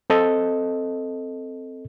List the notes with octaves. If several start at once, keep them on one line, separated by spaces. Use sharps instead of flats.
C4 A4 D#5